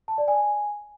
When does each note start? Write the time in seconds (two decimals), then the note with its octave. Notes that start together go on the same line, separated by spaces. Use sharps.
0.08 A5
0.18 D5
0.28 G#5